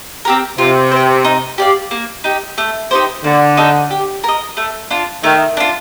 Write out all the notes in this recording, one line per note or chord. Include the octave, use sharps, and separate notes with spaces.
C4 G4 A#4
C3 F4
C5 G5
D#4
G4 D5 F5
A#3
D#4 G4
A3
D#4 G4 C5
D3 A#3
D#4 A4
G4
A#4 D#5
A3
D4 F4
D#3 A3
D4 F4